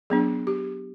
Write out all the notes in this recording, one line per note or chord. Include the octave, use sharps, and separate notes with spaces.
F#3 B3 D4 G#4
G4